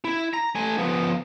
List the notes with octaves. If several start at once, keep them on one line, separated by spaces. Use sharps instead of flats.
E4
A#5
A3 G#5
F3 B3